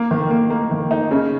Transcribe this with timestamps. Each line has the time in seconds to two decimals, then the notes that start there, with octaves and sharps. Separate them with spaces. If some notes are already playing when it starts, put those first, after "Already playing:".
Already playing: A#3
0.11 D#3
0.31 A#3
0.50 A#3
0.71 D#3
0.91 D#4
1.11 C#3